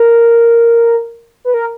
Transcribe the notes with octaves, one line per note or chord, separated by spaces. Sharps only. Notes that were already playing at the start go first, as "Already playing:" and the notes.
Already playing: A#4
B4
A#4